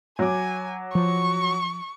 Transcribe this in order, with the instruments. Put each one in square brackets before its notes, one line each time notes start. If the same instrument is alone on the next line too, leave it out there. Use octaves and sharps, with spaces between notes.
[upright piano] F#3 D6 [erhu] G#5
[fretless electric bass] F3 [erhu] C#6